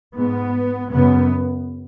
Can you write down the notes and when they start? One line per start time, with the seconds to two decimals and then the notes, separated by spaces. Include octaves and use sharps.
0.15 G#2 B3
0.92 F#2 C#3 B3